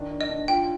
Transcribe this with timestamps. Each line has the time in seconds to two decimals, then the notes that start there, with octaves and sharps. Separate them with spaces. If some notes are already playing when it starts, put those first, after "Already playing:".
Already playing: D#3 D4
0.11 D4
0.21 D#5
0.29 D4
0.48 F4 G5